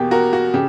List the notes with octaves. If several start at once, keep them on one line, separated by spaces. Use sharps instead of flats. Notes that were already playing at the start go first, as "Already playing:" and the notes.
Already playing: E2 B2 A#3 G4
F#4 A#4
F#4
C#3 G4